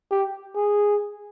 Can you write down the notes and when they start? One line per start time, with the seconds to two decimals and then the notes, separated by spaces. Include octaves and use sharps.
0.11 G4
0.56 G#4